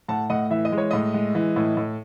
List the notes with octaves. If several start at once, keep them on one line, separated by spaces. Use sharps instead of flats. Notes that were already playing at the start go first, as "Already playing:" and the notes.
A2 F#5 A5
A2 D#5 F#5
E3 E5
D#5
G#3
C#5
A2 D#5
G#3
E3
A2
A2